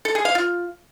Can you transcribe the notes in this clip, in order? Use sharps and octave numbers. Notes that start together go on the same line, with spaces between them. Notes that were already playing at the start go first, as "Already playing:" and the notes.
A4
G#4
F5
F4